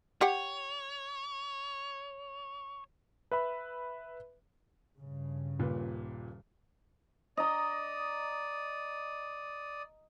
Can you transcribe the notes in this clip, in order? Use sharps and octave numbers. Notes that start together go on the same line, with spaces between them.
G4 C#5 F#5 G5
B4 E5 B5
G2 C#3
D#1 A#2 B4
D5 D#5 A#5 D#6